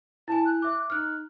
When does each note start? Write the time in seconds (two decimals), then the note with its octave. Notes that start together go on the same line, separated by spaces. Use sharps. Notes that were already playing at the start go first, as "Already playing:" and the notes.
0.28 E4 G#5 A5
0.45 F#6
0.62 E5 D6
0.90 D#4 F6 F#6